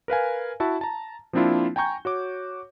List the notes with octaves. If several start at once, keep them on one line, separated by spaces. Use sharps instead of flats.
A#4 B4 F5 G#5
E4 F#4 E5 A5
A5 A#5
F3 A#3 C4 D4 E4 F4
G5 G#5 A#5 C#6 G6
F#4 C#5 D6